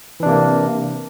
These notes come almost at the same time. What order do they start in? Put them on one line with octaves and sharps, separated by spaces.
E3 D4 C3 A#3